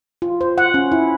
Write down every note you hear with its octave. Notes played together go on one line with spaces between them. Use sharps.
F4
C5
F#5
C#4
E4